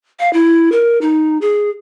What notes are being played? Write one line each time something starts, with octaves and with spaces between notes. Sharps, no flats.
F5
E4
A#4
D#4
G#4